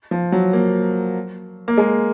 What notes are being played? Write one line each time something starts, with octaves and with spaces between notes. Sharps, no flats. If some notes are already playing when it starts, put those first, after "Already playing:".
F3
F#3
A#3
A#3
G#3